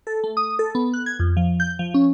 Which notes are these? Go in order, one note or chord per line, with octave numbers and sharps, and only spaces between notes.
A4
A3
D#6
A4
B3
F#6
G#6
F2
F3
G6
F3
C#4